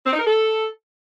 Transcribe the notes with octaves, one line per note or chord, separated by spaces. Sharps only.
C4
D#4
A#4
A4